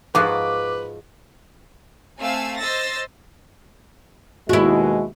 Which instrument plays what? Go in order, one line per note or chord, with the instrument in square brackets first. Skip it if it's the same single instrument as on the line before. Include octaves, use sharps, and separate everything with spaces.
[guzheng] G#2 F3 F#4 [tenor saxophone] B4 [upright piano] D6
[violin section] A3 C4 F5 G#5 E6
C5 D#5 E6 A6 A#6
[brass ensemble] D#2 B2 G#3 [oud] E4 F#4